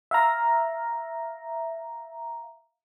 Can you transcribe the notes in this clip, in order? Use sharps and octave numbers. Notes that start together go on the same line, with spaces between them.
E5 F5 A#5